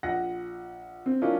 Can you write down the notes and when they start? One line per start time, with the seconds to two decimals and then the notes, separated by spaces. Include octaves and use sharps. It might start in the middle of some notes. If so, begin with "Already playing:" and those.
0.03 A#1 F#5 A#6
1.06 C4
1.22 F#3 A#3 C#4 D4 E4 F4